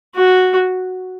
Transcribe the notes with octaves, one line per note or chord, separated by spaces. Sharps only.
F#4